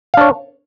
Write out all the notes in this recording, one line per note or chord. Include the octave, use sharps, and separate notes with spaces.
D4 C#5 F5